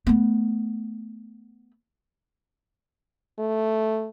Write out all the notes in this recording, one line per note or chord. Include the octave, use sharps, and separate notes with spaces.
A3 B3
A3